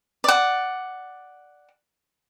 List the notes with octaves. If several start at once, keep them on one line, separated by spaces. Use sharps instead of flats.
D5 F#5